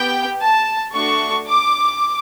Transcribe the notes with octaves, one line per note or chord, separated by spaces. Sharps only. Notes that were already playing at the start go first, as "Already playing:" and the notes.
Already playing: B3 G4 G5
A5
A3 D4 F#4 C#6
D6